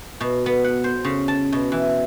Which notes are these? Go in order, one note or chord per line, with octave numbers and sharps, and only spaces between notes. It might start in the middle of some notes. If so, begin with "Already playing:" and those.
B2
B3
F#5
C5
C#3
A5
B2
E3